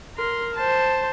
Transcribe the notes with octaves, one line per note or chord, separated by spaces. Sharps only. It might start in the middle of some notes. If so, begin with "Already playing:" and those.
A#4 C6
C5 A5